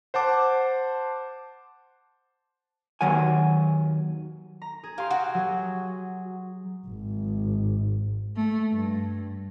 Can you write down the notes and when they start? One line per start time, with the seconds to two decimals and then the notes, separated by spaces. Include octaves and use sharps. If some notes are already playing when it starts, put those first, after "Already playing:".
0.14 C5 F#5 A5 D6
3.01 D#2 D#3 F#3 F#5 G#5
4.62 A#5
4.83 G#4
4.98 G4 F5 G#5 C6
5.11 F#4
5.34 F#3 G#4
6.87 G#1
8.37 A3
8.73 G2